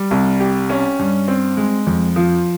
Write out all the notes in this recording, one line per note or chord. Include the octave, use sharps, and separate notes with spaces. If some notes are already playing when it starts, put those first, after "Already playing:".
Already playing: G3
C2
G4
C#4
G2
C4
G#3
F2
F3